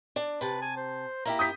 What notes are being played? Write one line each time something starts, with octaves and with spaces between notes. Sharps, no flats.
D4
C3 B4 A5
G#5
C5
A#3 E4 G4 A#5
D#6 G6 B6